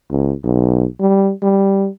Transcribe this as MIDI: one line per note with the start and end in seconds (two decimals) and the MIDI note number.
0.10 0.33 37
0.43 0.85 35
1.00 1.31 55
1.42 1.88 55